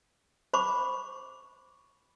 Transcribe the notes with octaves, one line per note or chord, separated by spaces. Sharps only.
C5 B5 C#6 D6